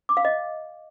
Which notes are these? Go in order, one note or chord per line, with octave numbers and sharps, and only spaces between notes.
D6
F5
D#5